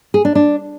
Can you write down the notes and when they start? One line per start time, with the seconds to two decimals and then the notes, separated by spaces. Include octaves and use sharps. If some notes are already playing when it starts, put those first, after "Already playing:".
0.14 G#4
0.25 D4
0.35 D4